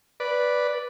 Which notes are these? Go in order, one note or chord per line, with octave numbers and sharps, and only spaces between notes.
B4 D5